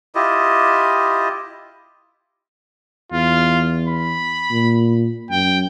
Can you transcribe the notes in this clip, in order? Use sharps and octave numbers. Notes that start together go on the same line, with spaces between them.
E4 F4 G4 D#5
E2 F4
B5
A#2
F#2 G5